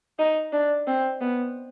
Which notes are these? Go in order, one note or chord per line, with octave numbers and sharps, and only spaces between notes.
D#4
D4
C4
B3